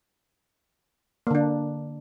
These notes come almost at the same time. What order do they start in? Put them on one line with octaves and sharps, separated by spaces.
A#3 D3 D4